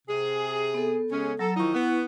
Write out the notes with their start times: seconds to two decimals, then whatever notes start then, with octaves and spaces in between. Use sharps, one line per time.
0.08 C3 G#4
0.74 B3 A4
1.11 C#3 G#3 C#4
1.39 F#3 A4 A#5
1.56 D#3 F3 D#4 E4 C#6
1.74 B3